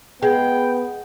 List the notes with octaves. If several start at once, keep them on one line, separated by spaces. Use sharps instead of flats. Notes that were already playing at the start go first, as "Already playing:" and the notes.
G#3 B3 G5